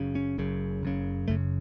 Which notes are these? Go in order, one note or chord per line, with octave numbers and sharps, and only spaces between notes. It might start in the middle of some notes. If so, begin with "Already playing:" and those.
Already playing: F#1 F#2 C#3
C#4
F#1 F#2 C#3
F#1 F#2 C#3
F#1 F#2 C#3 A3